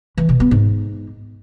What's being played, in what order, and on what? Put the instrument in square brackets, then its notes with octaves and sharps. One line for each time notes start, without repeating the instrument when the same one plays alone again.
[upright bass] E3
B2
B3
G#2